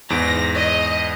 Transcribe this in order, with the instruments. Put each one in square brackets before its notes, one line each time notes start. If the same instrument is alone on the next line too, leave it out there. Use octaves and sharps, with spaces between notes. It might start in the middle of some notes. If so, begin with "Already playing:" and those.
[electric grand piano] E2 G#2 D7 [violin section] A#6
[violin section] D#5